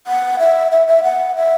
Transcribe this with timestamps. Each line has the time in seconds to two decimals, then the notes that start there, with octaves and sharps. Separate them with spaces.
0.07 F#5
0.39 E5
0.72 E5
0.87 E5
1.03 F#5
1.36 E5